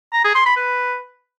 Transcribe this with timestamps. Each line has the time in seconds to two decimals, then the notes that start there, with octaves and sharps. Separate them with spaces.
0.13 A#5
0.24 G#4
0.35 C6
0.46 B5
0.57 B4